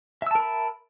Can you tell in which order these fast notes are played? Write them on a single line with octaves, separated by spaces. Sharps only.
E5 E6 A5 A#4 B5